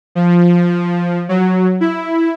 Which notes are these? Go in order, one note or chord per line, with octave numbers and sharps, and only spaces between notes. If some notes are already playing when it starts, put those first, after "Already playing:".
F3
F#3
E4